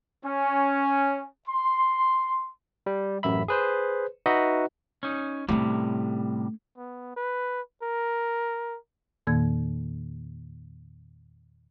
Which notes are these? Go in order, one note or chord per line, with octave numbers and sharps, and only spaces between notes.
C#4
C6
G3
A1 F#2 E5 B5
G#4 B4 C5
D#4 F#4 B4 D#5 E5 F#5
C#4 D#4
A2 C3 G3 A3 C#4
B3
B4
A#4
E2 A#2 D#3 A#3 G#6